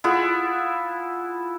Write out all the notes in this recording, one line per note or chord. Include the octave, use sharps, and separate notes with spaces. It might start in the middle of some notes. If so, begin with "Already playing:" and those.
E4 F4 G#4 F#5